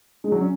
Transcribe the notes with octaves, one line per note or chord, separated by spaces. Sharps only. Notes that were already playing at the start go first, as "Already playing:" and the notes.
G#3
F#3
C#4